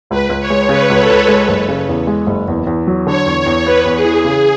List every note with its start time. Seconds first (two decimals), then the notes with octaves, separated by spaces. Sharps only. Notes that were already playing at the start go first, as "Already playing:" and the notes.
0.10 C#2 B4
0.29 C#2
0.40 C#5
0.50 G#3
0.69 C#3 B4
0.90 C#2
0.99 A4
1.09 C#2
1.28 G#3
1.49 F#1
1.68 C#3
1.89 E2
2.07 G#3
2.27 F#1
2.48 E2
2.67 E2
2.87 F#3
3.06 D3 C#5
3.26 E2
3.46 E2
3.66 B3 B4
3.85 E2
3.95 G#4
4.05 E3
4.25 C#3 G#4